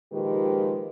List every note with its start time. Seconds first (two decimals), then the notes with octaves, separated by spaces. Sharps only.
0.13 A#2 D#3 F3 G#3 G4 B4